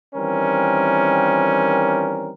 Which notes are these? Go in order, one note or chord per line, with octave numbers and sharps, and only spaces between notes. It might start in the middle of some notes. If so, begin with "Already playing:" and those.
D#3 E3 G3 C4 C#4 A#4